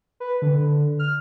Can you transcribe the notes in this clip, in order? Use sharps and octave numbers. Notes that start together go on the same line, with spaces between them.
B4
D3
F6